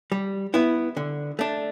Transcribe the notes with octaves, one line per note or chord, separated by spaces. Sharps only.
G3
B3 E4
D3
A3 D4